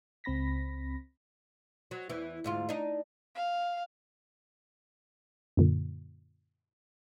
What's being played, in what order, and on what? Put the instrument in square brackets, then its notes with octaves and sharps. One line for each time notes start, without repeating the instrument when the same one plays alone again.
[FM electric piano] C#2 C4 B5 A#6 B6
[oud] F#3
E2 E3
D2 G#2 F4
D4 D#4
[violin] F5
[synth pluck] F#2 A#2 D3